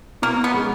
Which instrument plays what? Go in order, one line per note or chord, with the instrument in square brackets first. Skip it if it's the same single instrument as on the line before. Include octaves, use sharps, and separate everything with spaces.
[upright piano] B2 [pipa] A#3
[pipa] B3
[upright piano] G#3 C#4